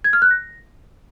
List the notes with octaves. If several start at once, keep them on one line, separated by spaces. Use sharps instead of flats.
G#6
F6
F#6
A#6